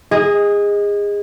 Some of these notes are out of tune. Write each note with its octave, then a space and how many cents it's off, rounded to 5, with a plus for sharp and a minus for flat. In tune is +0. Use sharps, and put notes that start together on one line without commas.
G#4 -25 D#5 +5